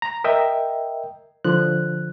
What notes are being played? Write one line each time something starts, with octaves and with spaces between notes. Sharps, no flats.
A#5
A#4 D#5 E5 G5
D3 F3 F#6